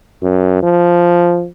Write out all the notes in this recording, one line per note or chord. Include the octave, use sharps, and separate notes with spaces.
F#2
F3